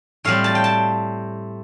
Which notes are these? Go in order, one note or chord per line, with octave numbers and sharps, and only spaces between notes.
A2 G3 C4 F5
A5
G5
A5